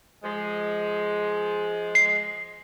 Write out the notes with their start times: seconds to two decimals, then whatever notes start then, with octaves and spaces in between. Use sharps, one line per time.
0.23 F3 G#3
1.95 C7